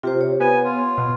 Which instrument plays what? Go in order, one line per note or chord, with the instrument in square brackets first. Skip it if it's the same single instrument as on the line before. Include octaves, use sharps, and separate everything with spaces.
[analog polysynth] C3 [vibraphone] F4 G4 C5
[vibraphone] C#5
[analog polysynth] B3 [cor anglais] G#5
[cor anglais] F4
[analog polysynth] B2